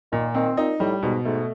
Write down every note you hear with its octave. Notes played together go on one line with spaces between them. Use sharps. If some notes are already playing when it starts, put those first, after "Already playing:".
A#2 D#3
D#3 C4
A#2 D#4
A2 G3
G#2 B2
G#2 A3